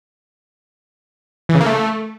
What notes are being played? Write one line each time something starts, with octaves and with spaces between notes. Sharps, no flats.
E3
C#3
A#3
A3